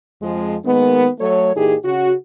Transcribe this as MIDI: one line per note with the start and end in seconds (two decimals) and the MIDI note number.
0.21 0.55 41
0.21 0.55 53
0.21 0.55 56
0.65 1.08 51
0.65 1.08 56
0.65 1.08 58
0.65 1.08 59
1.20 1.51 54
1.20 1.51 57
1.20 1.51 69
1.20 1.51 73
1.55 1.75 46
1.55 1.75 52
1.55 1.75 63
1.55 1.75 67
1.55 1.75 68
1.84 2.12 49
1.84 2.12 66